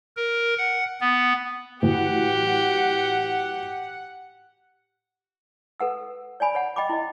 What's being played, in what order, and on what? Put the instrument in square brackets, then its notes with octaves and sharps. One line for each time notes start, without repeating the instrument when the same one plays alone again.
[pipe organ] A#4
F#5
B3
[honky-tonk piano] A2 E3 F#3 [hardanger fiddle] G4 [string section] F#5
[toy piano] A4 B4 F#5 E6
C#5 D5 G#5 B5
C#5 F#5
D#5 G5 B5 D6
E4 D#5